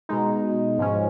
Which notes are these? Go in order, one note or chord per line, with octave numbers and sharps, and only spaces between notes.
B2 G#3 D#4
G#2 F3 G#3 C#4